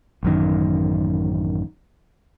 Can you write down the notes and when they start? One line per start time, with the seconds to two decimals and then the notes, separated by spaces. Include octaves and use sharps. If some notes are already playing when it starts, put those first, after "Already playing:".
0.23 A1 F#2 D#3